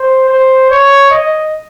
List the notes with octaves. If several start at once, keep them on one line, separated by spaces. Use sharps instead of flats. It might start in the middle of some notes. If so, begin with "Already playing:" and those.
Already playing: C5
C5
C#5
D#5